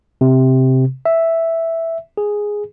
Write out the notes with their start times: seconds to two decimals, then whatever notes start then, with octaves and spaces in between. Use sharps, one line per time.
0.21 C3
1.05 E5
2.17 G#4